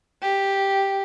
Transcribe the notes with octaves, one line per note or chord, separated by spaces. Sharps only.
G4